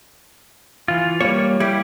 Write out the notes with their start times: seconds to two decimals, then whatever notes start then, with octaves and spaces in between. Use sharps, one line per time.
0.88 E3 F4
1.21 G3 A#3 C#5
1.60 G3 E4 G4